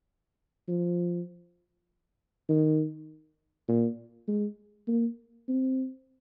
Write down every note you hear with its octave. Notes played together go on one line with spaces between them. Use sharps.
F3
D#3
A#2
G#3
A#3
C4